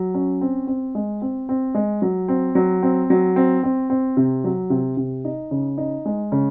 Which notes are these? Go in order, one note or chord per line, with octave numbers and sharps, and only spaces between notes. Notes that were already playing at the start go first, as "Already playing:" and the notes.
Already playing: F#3
C#4
C4
C4
G#3
C4
C4
G#3
F#3
C4
F#3
C4
F#3
C4
C4
C4
C3
F#3
C3
C3
D#4
C#3
D#4
G#3
C#3